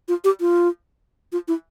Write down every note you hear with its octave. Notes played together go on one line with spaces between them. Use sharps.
F4
G4
F4
F4
E4